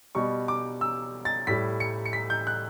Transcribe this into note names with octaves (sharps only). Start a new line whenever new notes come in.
B2 G3 C#6
D6
E6
A6
A2 G3 B6
C#7
C#7
B6
G6
F#6